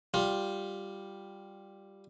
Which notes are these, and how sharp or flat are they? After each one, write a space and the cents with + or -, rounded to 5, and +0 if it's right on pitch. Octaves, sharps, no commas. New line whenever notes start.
G3 +0 F4 +10